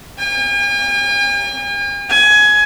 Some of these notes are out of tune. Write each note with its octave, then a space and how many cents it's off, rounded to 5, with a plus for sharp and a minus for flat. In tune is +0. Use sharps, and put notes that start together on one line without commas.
G#5 -45
G#5 +20